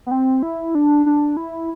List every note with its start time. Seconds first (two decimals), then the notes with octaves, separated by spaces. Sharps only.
0.06 B3
0.11 C4
0.43 E4
0.75 D4
1.06 D4
1.37 E4